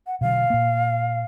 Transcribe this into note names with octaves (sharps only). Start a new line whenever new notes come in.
F#5
B2 D3 F#3 F5
A#2 A#3